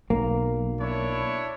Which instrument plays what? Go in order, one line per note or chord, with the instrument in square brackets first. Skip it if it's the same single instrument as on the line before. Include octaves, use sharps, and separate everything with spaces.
[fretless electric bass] B1 [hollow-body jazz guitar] A#3
[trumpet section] D4 E4 C#5